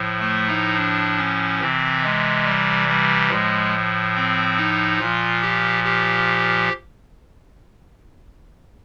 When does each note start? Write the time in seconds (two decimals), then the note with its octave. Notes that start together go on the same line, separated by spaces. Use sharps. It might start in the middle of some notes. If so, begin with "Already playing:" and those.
Already playing: A2 F3
0.20 A3
0.47 D#4
0.76 D4
1.18 C#4
1.61 C3 E3 C4
2.04 G#3
2.45 G3
2.88 G3
3.29 A2 F3 G#3
4.15 C4
4.57 D#4
4.99 A#2 F3 F4
5.41 G4
5.84 G4